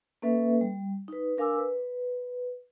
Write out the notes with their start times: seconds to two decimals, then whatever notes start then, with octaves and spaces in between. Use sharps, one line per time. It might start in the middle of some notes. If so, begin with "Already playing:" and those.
0.22 A#3 C#4 A4 B4 E5
0.61 G3
1.08 D#4 B4
1.38 D4 A#4 F5 G#5 D6 E6
1.57 B4